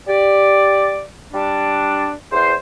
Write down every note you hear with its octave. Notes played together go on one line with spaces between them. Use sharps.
G4 D5
G3 D4
E2 C5